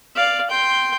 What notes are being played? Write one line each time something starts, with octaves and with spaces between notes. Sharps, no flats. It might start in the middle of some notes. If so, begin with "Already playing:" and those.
D5 F5
G5 C6